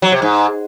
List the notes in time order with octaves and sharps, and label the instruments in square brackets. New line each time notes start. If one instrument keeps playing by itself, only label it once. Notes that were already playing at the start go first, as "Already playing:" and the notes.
[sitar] F#3
C3
G#2